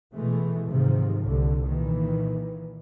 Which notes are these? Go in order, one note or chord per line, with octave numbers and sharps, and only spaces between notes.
B2 E3 G#3 A3
G#2 C3 D#3 F3
C2 A2 D3
A#2 D#3 E3